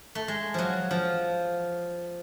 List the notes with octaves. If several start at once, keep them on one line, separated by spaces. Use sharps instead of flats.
A3
G#3
F3 F#3
F3